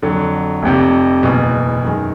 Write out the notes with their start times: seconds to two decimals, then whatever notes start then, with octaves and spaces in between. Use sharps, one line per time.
0.02 F2 D3 F#3
0.63 F1 F2 C3
1.23 F#1 E2 B2
1.84 F#2 D#3 G#3